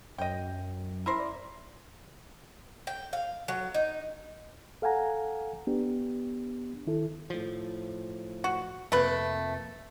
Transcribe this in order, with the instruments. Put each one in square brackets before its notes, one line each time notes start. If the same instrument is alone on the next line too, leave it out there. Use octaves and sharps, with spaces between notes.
[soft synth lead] F#2 [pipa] D#5 G5
[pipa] E4 A#4 C5
[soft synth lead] D5
[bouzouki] G5
F5
F#3
D#4
[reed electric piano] A4 F5 F#5 G#5 A#5
B3 D4 G4
D#3 E4 A4
[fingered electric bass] A2 F3
[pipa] F#4
[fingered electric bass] F2 C3 A#3 [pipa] A3 B4